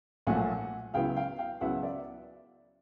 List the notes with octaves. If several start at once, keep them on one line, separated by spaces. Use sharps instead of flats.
B1 A#2 F3 A3 F#5 G#5
C#2 C#3 F#3 B3 E4 F5 G5
F5 G5
F5 G5
C#2 C#3 F#3 B3 E4 E5 F#5
D5 E5